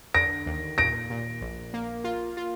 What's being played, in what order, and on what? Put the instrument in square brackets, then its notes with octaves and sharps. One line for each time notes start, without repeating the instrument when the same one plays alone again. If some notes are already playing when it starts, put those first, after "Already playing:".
[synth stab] D3 [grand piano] A#6 D7
[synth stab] D#2
[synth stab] A#2 [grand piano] A#6 D7
[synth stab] A#2
A#1
A#3
F4
F4